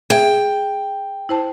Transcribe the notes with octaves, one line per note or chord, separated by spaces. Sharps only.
G#4 E5 G5
E4 C5 A5